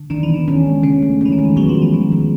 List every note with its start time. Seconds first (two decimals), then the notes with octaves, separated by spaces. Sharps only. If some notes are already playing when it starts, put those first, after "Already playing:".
Already playing: D3
0.10 D#3 D4
0.23 E3
0.29 D#3 B3
0.48 C#4
0.66 G#3
0.83 C#3 C#4
1.02 A3
1.21 E3 C#4
1.32 D#3
1.39 G#3
1.45 E3
1.57 F#3 B3
1.69 F3
1.75 F#3
1.82 E3
1.93 D#3 G#3
2.12 F3